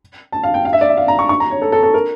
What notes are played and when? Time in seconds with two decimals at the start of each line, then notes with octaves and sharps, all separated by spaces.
0.32 A5
0.43 F5
0.54 G5
0.65 F5
0.73 E5
0.81 D5
0.89 E5
0.97 F5
1.08 A#5
1.19 C#6
1.29 C#6
1.40 A#5
1.50 C#5
1.62 A4
1.72 A4
1.83 A4
1.94 A#4